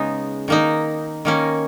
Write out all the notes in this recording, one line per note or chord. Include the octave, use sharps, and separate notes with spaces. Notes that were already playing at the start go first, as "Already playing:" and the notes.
Already playing: C#3 G#3 B3 D#4
D#3 A#3 D#4
D#3 A#3 C#4